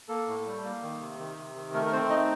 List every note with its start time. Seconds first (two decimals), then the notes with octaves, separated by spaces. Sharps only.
0.08 A#3 A4
0.27 A2
0.46 G3
0.64 A#3
0.82 D#3
1.00 C3
1.19 D#3
1.37 C3
1.55 D#3
1.74 A3 A#4
1.86 A#4
1.92 C4 C5
2.10 D#4 D#5